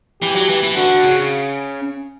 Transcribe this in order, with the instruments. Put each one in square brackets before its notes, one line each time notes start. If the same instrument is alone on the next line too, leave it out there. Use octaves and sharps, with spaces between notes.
[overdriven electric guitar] E3 [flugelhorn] G4
[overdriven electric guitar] F#3
E3
E3
[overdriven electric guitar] D3 [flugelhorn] F#4
[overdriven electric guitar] C#3